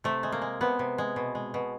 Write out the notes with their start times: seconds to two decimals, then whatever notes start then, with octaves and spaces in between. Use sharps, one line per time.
0.04 C3 A3
0.23 G#3
0.32 A#3
0.42 G#3
0.61 C3 B3
0.79 C3
0.98 G#3
1.16 B2
1.35 G#3
1.54 B2